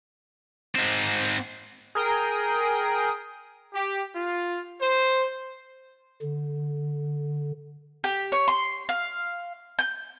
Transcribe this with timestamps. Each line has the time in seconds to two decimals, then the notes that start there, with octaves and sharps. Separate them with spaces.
0.75 G#2 C4
1.95 G#4 A#4 G5 D#6
3.74 G4
4.14 F4
4.80 C5
6.22 D3
8.04 G4
8.32 C#5
8.48 C6
8.89 F5
9.79 G6